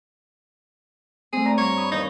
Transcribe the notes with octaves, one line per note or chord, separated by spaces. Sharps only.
A3 C4 G#4
D5 F#5 A#5
G2 C#5
B5 C#6 D#6
D#2 E3 D#4 C#5